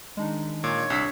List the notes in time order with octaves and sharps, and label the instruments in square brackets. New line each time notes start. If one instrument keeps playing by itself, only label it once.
[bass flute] D#3 [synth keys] G#3 D4 D#4
[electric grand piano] A#2 [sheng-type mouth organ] C#5
[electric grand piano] C2 E6 B6 [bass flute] D4